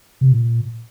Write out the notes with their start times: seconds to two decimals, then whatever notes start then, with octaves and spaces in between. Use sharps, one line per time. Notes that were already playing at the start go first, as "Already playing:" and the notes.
0.21 C3
0.32 A#2